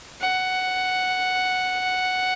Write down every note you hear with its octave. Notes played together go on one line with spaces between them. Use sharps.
F#5